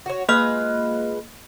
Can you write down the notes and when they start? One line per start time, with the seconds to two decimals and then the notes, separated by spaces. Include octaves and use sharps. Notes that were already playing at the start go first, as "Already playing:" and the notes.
0.06 F#4 C#5
0.29 G#3 A#3 F4 B4 D#5 F6